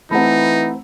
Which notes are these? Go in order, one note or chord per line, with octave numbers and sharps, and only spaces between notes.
E3 A3 C4 D#4 F#5 A#5 B5